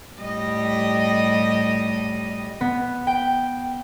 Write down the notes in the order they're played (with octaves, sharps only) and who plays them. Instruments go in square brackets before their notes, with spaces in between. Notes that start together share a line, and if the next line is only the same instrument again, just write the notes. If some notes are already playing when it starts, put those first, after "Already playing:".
[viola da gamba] A2 G3 D#5
[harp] B3
G5